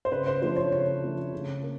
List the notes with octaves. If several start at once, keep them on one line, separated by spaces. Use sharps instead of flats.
C5
C#3 B4
C5
F3 A3 D4 C5
C#5
C#3 C#5
F3 A3 D4
C#3
A#3